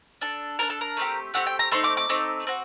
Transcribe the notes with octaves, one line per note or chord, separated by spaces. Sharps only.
D4 A4
D4 A4 A#4
A4
A#4
A3 C4 G4
A3 C4 G4 F#5
G5
A#5
A3 C4 D#4 C6
D6
D6
A3 C4 D#4
C4 F#4